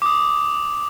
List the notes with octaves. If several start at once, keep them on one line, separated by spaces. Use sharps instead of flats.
D6 D#6